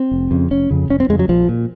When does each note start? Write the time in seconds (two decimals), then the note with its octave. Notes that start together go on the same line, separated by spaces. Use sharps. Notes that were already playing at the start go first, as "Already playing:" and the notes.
Already playing: C4
0.11 F1
0.31 F2 C#3
0.51 F1 C#4
0.71 F2 C#3
0.89 F1 C#4
1.00 C4
1.09 F2 C#3 G#3
1.19 F#3
1.29 A#1 F3
1.49 A#2